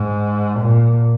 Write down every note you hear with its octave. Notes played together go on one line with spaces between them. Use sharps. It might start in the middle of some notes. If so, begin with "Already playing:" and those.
Already playing: G#2
A#2